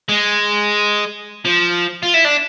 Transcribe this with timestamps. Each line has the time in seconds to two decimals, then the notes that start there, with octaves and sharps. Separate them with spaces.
0.09 G#3
1.45 F3
2.03 F4
2.14 E4
2.25 D4